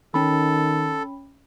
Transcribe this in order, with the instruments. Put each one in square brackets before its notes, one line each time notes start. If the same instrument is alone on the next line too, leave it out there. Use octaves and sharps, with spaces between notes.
[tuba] D#3 [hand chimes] C#4 B5 [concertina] A4